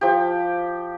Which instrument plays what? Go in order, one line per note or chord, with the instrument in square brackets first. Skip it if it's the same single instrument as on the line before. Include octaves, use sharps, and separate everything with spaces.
[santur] F3 G4